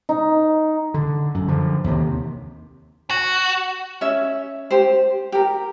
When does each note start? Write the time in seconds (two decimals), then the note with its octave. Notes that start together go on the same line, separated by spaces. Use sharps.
0.09 D#4
0.94 D3
1.34 F#2
1.48 D3 F3
1.84 D#2 C3
3.10 F#4
4.01 C#4 C#5 E5
4.71 G4 C5
5.32 G4 A#4